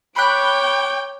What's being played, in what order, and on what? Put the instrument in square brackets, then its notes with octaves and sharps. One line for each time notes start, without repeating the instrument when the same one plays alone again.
[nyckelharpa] C#5 D6 [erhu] G5 [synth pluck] B5 F#6